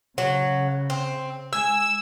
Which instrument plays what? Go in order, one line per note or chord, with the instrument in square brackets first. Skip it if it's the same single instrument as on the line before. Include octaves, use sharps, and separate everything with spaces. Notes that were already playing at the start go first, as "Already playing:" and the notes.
[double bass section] C#3 [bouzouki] F#3
[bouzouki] C4
[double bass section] G#3 [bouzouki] G#5 [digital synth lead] E6